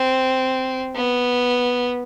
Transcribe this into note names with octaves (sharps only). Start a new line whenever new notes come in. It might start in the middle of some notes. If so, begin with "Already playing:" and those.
Already playing: C4
B3